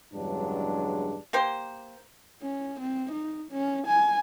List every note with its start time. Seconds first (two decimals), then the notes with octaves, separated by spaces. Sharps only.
0.13 E2 G2 C#3 F#3 G#3 D4
1.33 A#3 G4 C5
2.42 C#4
2.80 C4
3.12 D#4
3.51 C#4
3.87 G#5